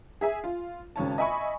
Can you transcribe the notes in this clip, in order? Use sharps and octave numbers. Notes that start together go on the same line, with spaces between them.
G#4 E5 G#5
F4
G#1 C#3 C#4 A5
D#5 E5 G#5 B5 C#6